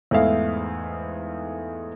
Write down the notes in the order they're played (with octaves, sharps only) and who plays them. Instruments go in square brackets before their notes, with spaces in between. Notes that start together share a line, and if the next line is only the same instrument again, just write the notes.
[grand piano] E2 G#2 A3 E4 F5